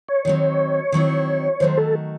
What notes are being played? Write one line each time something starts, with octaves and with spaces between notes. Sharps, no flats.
C#5
D#3 F#3 C4
D#3 F#3 C4 E4
D#3 F#3 A3 C5
A4